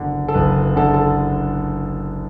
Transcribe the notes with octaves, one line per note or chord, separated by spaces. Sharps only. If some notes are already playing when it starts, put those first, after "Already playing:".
Already playing: F#1 D3
A4
F#1 B4
D3 A4
A4